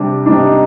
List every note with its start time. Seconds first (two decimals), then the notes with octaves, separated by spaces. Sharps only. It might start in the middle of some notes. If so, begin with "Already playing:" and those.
Already playing: C3 G3 D4
0.26 C3 G3 D4 D#4